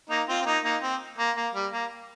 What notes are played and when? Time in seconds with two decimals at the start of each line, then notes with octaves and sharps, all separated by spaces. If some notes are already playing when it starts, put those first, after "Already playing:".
0.10 A#3 D#4
0.28 C4 F4
0.41 C4
0.46 A#3 D#4
0.64 A#3 D#4
0.82 C4
1.18 A#3
1.36 A#3
1.54 G3
1.72 A#3